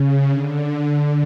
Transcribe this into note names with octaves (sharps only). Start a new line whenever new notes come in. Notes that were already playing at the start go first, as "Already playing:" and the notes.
Already playing: C#3
D3